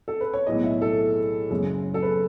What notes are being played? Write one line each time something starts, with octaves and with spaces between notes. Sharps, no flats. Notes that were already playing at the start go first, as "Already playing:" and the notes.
A4
B4
C#5
B1 A2 G#3 D#5
E5
A4
F#1 F#2 C#3 G#3
A4
B4